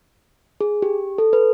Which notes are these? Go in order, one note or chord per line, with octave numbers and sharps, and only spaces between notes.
G#4
G4
A4
B4